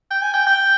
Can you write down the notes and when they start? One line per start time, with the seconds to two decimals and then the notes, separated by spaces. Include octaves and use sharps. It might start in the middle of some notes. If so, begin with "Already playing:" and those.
0.11 G5
0.22 G#5
0.34 G5
0.47 G5